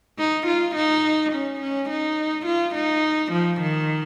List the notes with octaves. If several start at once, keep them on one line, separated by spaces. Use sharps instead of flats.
D#4
F4
D#4
C#4
C#4
D#4
F4
D#4
F3
D#3